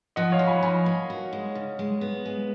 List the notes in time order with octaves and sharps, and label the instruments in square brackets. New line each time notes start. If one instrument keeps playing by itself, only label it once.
[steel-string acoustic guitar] F3 [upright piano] D#5 F#5
[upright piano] C#5 F5
[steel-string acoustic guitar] F3
[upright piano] G#5 B5
[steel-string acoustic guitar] F3 [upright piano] G#5 B5
[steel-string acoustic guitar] A#3
F#4
G#3
C#3
G#3
B3
G#3